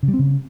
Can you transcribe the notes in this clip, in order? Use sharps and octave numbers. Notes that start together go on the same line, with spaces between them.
C#3
G3
C4
C#3